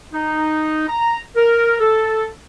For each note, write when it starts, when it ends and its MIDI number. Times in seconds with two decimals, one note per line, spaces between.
0.13 0.85 63
0.88 1.18 82
1.36 1.79 70
1.79 2.25 69